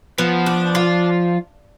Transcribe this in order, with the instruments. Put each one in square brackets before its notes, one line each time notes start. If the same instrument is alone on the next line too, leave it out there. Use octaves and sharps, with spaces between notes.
[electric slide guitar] F3 [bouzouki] B3
[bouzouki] D4
F4